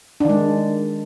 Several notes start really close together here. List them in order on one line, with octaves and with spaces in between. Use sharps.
D4 D#3 G#3